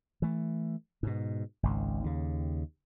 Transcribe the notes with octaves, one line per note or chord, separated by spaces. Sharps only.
E3 A3
G#2 B2
G#1 C#2 G#2
D#2 C#3